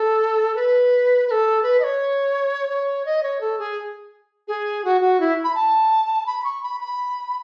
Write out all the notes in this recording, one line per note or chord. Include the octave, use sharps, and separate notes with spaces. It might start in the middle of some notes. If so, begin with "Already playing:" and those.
Already playing: A4
B4
B4
A4
B4
D#5
C#5
C#5
D#5
C#5
A4
G#4
G#4
F#4
F#4
E4
B5
A5
B5
C#6
B5
B5